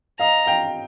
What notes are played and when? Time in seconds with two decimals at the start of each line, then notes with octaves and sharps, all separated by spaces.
0.19 D#5 F5 A#5
0.46 F5 G5